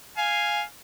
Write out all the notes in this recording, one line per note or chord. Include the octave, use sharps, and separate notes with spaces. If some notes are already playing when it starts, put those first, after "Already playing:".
F5 G#5